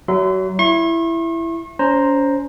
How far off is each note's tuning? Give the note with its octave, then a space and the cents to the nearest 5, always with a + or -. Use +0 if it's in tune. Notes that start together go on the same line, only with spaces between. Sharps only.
F#3 +30 E5 +0 C6 -35
E4 +10 C#6 -45
C#4 +35 C5 +5 A#5 +0